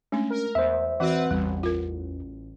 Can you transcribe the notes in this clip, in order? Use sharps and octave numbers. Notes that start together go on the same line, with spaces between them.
G#3 A3 C#4 D4
A#4
E2 C5 E5
E3 C4 F#4 B4 F#5
A1 E2 G3
F4 A#4